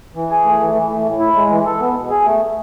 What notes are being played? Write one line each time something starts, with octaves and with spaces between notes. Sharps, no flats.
E3
G#4
A3
E3
E3
A3
A2
E4
G#3
E3
A4
B3
B2
G#4
A3